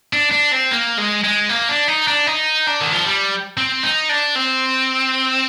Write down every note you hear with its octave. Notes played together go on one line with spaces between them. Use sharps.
D4
D4
C4
A#3
G#3
G#3
A#3
D4
D#4
D4
D#4
D4
D#3
F3
G3
C4
D#4
D4
C4